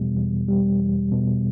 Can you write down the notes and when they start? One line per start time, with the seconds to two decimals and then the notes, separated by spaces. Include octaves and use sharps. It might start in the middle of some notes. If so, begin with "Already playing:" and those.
Already playing: E2 B2 G3
0.16 E2
0.48 G3
0.80 E2
1.12 B2